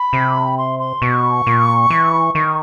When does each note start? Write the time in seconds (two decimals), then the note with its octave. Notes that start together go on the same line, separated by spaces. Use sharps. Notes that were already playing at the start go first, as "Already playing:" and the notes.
Already playing: B5
0.13 C3
0.58 C6
0.80 C6
1.02 B2 C#6
1.47 A#2
1.90 E3
2.35 D#3 C#6